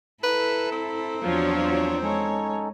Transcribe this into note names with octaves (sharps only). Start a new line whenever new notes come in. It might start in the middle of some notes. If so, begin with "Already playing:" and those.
E4 A4 B4 A#5
C4
E2 F3 F#3 D4 C#5
G#3 C#4 D#4 A4 C#5